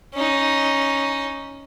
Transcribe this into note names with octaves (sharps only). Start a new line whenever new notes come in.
C#4 D#4